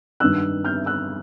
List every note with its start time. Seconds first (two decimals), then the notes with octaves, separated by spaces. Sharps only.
0.20 G2 D#3 E6 F#6
0.65 F6 G6
0.86 E6 F#6